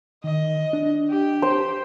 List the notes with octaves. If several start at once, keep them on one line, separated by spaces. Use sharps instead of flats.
D#3 D#5
D4
G4
C5